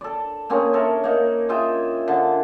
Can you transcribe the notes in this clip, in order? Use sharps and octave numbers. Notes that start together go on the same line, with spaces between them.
A4 D5
A#3 C4 C#4 G#4
A4 A#4 C#5 E5
A#3 D#4
F4 G#4 E5 G5
D3